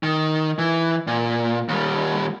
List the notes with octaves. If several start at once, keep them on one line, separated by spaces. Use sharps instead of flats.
D#3
E3
A#2
D#2 G3